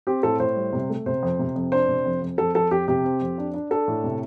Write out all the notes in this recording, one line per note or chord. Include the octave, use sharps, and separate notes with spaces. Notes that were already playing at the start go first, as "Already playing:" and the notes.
C4 G4
A2 A4
A2 C5
G3
C3
A3
C3 C5
F2
C3
F2
D4 C5
C3
F2
F2
F2 A4
F2 A4
F2 G4
C3 G4
C4
F2
D4
D4
D4 A4
A2
C3